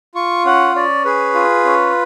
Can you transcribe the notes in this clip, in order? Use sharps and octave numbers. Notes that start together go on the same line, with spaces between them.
F4 C#6
C#4 F#5
C#4 D5
G#4 B4
F4
C#4